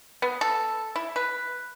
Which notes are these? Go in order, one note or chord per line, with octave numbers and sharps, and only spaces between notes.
B3
A4
E4
B4